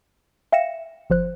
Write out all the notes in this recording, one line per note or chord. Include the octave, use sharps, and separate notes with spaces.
E5 F5 G5 A#6 C#7 E7
G1 F3 C5 F#6